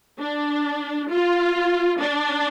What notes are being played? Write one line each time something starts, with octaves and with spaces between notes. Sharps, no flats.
D4
F4
D4